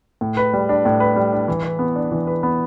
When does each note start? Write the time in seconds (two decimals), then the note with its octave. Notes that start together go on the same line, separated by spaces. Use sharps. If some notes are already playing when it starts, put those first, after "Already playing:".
0.21 A2
0.37 B4
0.54 G3
0.69 D4
0.85 A2
1.00 B4
1.16 G3
1.33 D4
1.48 E3
1.64 B4
1.79 B3
1.96 D4
2.11 E3
2.27 B4
2.43 B3